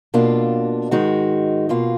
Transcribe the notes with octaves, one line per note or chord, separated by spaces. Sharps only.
B2 A#3 D4 F4
G#2 D#3 G#3 D#4 F#4
B2 A#3 F4